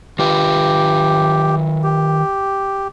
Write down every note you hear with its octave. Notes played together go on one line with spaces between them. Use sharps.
D#3 F4 G4 B4
G4